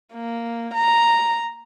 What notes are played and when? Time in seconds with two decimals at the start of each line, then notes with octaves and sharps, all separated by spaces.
0.14 A#3
0.74 A#5